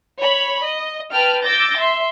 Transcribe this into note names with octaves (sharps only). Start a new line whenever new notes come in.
C#5 B5
D#5
B4 G5 A5 F6
D6 E6 G6 A6 A#6
E5 C6